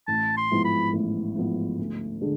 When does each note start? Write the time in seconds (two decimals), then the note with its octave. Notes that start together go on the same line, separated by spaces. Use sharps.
0.08 A1 A5
0.37 C6
0.51 G#2 F3 B3 E4
0.65 B5
0.93 A1
1.36 G#2 F3 B3 E4
1.79 D2
2.21 D3 G#3 D4 G#4